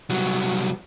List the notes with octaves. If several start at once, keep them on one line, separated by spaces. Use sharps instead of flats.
C2 F#3